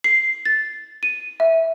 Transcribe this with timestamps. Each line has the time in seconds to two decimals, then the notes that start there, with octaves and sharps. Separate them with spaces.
0.04 C7
0.45 A6
1.03 D#7
1.40 E5